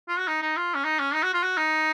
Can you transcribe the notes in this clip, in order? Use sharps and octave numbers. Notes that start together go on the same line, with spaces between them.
F4
F#4
D#4
D#4
F4
C#4
D#4
C#4
D#4
F#4
F4
F#4
D#4